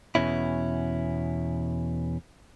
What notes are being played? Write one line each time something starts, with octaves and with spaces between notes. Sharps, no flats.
E2 B2 C#4 E4